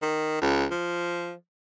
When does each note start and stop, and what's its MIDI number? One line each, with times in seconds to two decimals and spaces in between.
0.02 0.41 51
0.41 0.65 37
0.71 1.32 53